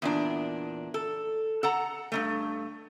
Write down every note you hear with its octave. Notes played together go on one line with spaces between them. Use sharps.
E2 A#2 D4
A4
A4 F#5 A#5
G2 C3 A3